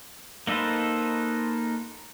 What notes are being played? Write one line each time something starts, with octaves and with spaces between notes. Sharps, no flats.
A#3 D#4 A4 B4 C5